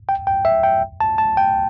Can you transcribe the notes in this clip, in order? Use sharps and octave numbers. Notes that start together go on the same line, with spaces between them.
G5
G5
E5
G5
A5
A5
G5